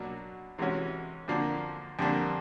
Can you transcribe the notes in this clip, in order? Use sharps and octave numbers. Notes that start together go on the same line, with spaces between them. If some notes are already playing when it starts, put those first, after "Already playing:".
Already playing: B2 F#3 A#3 D4 F#4
C3 E3 G#3 C#4 F#4
F2 D3 F3 A#3 D4
F2 D3 G3 A#3 D4